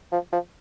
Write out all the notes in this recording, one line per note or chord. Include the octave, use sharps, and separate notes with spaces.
F3
F3